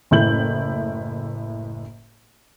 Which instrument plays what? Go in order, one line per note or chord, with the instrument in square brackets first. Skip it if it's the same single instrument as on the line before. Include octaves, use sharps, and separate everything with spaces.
[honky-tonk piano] F#1 A2 E4 G6 F#7